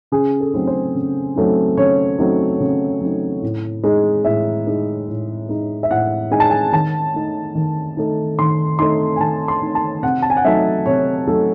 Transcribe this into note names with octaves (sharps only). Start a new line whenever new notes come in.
C#3 G#4
A4
F#3 A3 C4 D#4
C5
C#3
F#3 A3 C4 D#4
C#3 C#5
F#3 A3 C4 D#4
C#3
F#3 A3 C4 D#4
A2
G#3 D#4
A2 E5
G#3 D#4
A2
G#3 D#4
E5
A2 F#5
G#3 D#4 G#5
A5
G#5
D#3 A5
A3 D#4
D#3
A3 D#4
D#3 C6
A3 D#4 C6
G#5
D#3 A5
C6
A3 D#4
A5
C3 F#5
A5
G#5
F#5
F#3 A3 D#4 E5
C3 C#5
F#3 A3 D#4 A4